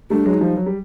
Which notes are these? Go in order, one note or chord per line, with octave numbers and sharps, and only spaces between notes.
G3 A3 D4
F#3 G#3
D#4
F3 G3
F#3
G3